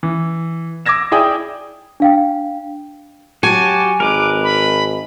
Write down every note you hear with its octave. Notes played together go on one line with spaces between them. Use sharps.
E3
D6 E6 G#6 A#6 E7
E4 G#4 D5 G5 D#6
D4 F5 G5
F#3 F#4 G4 G#5 A5
G#1 A#4 B4 D6
B5